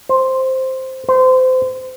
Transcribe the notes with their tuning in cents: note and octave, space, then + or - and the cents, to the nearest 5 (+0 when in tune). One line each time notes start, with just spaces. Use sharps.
C5 +0
C5 -30